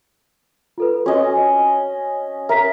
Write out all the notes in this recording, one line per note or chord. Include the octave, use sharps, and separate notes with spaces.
F4 A4 B4
C#4 F#4 D#5
A#4 E5 A#5 B6